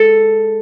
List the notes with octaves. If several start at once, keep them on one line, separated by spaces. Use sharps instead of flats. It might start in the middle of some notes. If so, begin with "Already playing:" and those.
Already playing: G#3 A4